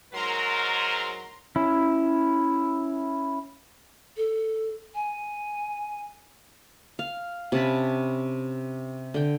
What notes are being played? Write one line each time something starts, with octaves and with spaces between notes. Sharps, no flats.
G#2 F#3 A#4 A#5 C6
C#4 E4
A4
G#5
F5
C3 C#4 A5 B5
D3 G5